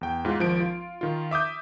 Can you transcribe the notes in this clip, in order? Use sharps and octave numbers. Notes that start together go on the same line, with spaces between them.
E2 G5
G#2 F4
G#1 F3 D7
F4
D#3 F4
E5 D6 D#6 G6